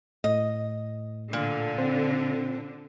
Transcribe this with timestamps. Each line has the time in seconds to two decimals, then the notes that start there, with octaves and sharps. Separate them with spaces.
0.24 A2 D#5
1.33 A#2 D3
1.78 C4